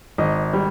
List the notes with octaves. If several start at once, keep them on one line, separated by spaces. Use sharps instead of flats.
G#1 D#5
G3